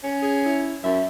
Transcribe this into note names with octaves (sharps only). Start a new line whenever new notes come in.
C#4
G#4
E4
F#2 E5